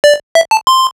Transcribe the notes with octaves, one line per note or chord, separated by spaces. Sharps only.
D5
E5
A5
C6